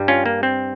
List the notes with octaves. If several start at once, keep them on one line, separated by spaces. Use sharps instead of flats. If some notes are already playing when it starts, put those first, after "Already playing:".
Already playing: G2 G3
C#4 F4
A#3
C4